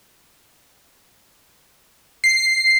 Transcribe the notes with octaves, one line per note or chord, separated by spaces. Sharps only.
C7